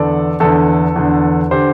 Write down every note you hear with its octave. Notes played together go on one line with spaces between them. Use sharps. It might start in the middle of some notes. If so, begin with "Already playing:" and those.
Already playing: E2 D3 A4 D5
E2 D3 A4
E2 D3
D3 G4 C5